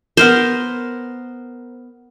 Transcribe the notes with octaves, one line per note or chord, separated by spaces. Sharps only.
B3 A#4 C5